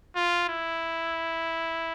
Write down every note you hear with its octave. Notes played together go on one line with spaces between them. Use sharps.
F4
E4